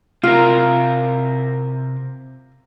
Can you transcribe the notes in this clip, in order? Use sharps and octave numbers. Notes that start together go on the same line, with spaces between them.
C3 F4 A#4